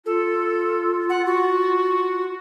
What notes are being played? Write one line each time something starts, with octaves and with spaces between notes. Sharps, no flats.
F4 A4
F#5
F#4